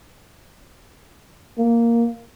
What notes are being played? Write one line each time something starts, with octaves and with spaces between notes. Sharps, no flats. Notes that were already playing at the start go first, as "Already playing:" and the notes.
A#3